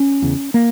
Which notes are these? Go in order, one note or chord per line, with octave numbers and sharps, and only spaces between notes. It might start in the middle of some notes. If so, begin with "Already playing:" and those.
Already playing: C#4
E2 C#3
A#3